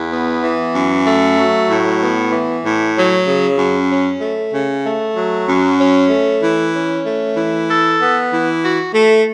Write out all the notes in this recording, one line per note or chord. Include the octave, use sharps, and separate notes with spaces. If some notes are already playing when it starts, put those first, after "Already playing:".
Already playing: E2
B3
E3
F#2
A3
F#3
A2
B3
E3
A2
F#3
C#3
F#2
C#4
A3
C#3
A3
F#3
F#2
C#4
A3
E3
C#4
A3
E3
A4
B3
E3
F#4
A3